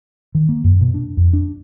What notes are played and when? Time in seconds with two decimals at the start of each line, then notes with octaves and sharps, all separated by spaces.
0.35 D#3
0.49 A#3
0.64 F#2
0.81 B2
0.94 D4
1.17 F2
1.33 D4